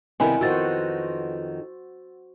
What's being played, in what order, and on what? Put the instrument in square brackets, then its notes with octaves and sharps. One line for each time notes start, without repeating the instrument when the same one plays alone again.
[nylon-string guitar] C3 D#3 G3 [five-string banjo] B3 E4 A#4 [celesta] G#5
[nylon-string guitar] F2 D#3 [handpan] F#4 C5 [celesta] E6 A6